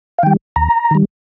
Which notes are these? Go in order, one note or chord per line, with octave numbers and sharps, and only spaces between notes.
F5
D#3 G3 G5
D#2 A#5
D#3 G3